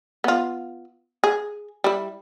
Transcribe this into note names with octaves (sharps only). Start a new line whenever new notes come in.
B3 F4
G#4
G3 E4